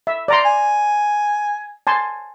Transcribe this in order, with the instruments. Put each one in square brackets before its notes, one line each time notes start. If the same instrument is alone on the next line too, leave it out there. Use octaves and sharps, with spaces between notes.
[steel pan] E5
D5 A#5 C6
[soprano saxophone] G#5
[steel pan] G#5 A5 C6